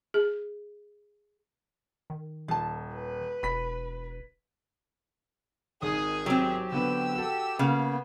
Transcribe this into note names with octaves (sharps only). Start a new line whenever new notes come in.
G#4
D#3
D#1 F4 A5
B4
E1 B5 B6
G#1 D#3 G#4 D#6
F#3 C4 G4
D3 B3 B4 E6
F#4 A4
C#3 A#3 B3